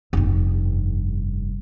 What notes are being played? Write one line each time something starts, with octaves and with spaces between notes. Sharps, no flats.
F1 G2